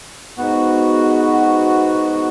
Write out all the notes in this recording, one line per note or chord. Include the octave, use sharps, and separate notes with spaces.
G#2 B3 F#4